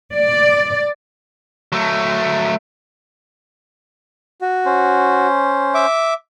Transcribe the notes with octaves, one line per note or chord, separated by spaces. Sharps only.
D5
F#3 A3
F#4
C#4 C5
E5 D6